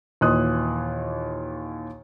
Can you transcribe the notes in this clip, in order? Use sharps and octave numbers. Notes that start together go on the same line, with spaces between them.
D#2 A#2 E3 D#5 D#6 F#6